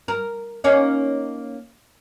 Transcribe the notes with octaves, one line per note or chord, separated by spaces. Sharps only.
A#4
A#3 C#4 D#4